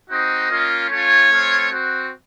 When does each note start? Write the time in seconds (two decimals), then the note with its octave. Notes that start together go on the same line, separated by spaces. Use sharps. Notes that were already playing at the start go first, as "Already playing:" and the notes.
0.10 C4 D#4 F#4 D#5
0.51 A#3 C#4 F4
0.90 A3 C#4 F4 C#5
1.30 A3 C4 F4
1.71 C4 F#4